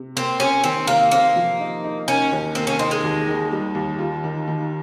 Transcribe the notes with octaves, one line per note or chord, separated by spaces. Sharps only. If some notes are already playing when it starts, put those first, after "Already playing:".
Already playing: C3
A#3 C4
C3 C#4
D#3 C4
C3 A#3
A#3 C4
F3
D#4
D#4
A#3 C#4
D#2
A#3 C4
C#4
C4 D#4
G#3
D#2
D#3
G3
D#2
F4
D#3
D#3